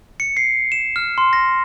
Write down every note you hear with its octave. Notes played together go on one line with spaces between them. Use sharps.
C#7
C7
E7
F6
C6
A#6